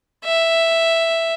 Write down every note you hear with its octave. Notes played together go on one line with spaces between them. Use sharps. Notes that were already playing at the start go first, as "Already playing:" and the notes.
E5